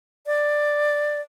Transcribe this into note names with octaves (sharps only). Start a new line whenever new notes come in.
D5